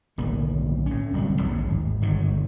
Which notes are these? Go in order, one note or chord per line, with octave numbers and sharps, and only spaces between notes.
D1 B1 D#3 A#3
A2 C#4
D1 C2 C#3 F#3
A#1 D#2 G#2 C#3
G#1
G1 G#2 B2 D#3